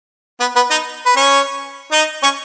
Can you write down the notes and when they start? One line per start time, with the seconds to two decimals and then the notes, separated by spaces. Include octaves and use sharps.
0.40 B3 B4
0.56 B3 B4
0.71 D#4 D#5
1.06 B4
1.16 C#4 C#5
1.92 D#4 D#5
2.23 C#4 C#5